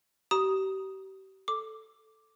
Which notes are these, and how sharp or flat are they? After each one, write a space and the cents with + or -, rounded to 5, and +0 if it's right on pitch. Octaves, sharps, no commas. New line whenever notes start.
G4 -35 A#5 +25 D#6 +0
A4 +0 D6 +0